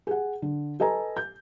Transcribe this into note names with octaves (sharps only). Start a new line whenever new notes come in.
G#4 F#5
D3
A4 B4 D#5 G#5 A#5
G6